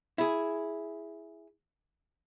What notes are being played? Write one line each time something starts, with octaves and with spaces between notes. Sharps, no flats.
E4 G#4